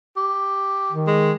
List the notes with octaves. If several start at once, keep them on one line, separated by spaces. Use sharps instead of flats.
G4
D#3
G#3